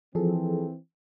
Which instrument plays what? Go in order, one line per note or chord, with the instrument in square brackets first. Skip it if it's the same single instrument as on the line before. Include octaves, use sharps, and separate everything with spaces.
[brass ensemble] E3 C4 [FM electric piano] F3 G#4 A4